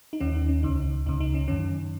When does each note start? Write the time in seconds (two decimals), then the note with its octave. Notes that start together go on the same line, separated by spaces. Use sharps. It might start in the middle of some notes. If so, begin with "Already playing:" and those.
0.13 D#4
0.20 D#2 D#3 C#4
0.35 D#4
0.49 C#4
0.63 C#2 C#3 D#4
1.06 C#2 C#3 D#4
1.20 D#4
1.34 C#4
1.48 F#2 D#3 C#4